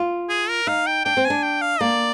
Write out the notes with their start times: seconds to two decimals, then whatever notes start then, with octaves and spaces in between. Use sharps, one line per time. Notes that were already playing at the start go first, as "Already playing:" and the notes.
Already playing: F4
0.30 G#4
0.49 A#4
0.67 D#4 F5
0.87 G5
1.05 D4 G5
1.17 C4
1.25 G#5
1.30 D4
1.43 G5
1.61 F5
1.81 A#3 D5